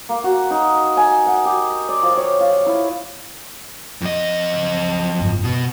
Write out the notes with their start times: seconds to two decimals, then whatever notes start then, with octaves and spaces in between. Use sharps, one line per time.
0.09 A#3
0.24 F#4
0.51 D#4
0.97 G#5
1.26 F#5
1.45 G4
1.89 D5
2.03 F3
2.17 C#5
2.40 F4
2.66 E4
4.01 F2 D#5
4.53 C#2
5.19 F#1 G#2
5.44 B2